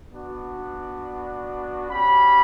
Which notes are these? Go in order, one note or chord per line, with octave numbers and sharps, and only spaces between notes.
B3 D4 F#4
C#4 G4 B5